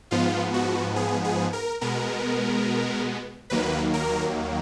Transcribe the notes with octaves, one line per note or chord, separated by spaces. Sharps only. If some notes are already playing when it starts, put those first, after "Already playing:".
G#2 F3 B3 F4
F#4
G#4
G#4
A#4
B2 G#3 B3 A#4
D#2 D#3 F#3 A#3 B4
A#4